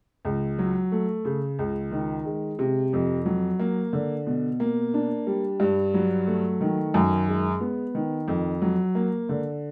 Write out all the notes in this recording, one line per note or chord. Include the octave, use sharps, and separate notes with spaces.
C#2
F#3
A3
C#3
C#2
D#3
G#3
C3
F2
F#3
A#3
D3
B2
A#3
D4
G3
G2
F#3
A3
D#3
F#2
G#3
B3
D#3
F2
F#3
A#3
D3